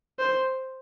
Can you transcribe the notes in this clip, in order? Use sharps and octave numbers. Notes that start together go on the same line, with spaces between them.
C5